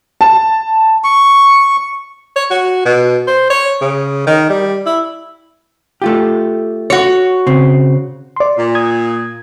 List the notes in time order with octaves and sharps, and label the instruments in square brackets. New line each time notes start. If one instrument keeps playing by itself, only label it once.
[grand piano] A5
[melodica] C#6
[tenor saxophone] C#5
F#4
B2
C5
C#5
C#3
D#3
G3
E4
[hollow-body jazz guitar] A3 F4 G4
[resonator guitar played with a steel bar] F#4 C#5
[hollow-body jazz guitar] C#3 C4
[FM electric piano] D5 C6
[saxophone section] A#2
[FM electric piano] D#6 G#6